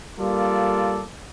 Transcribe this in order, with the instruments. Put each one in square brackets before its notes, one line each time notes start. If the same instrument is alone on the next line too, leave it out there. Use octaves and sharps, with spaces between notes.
[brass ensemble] G3 A#3 F4 A4 D5